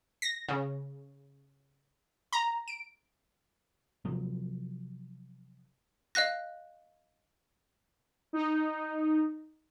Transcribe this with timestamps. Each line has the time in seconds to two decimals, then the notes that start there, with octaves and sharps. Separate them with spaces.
0.22 A#6
0.48 C#3
2.33 A#5
2.68 D7
4.05 C3 F3 F#3
6.15 D#5 F5 F#6 A#6
8.33 D#4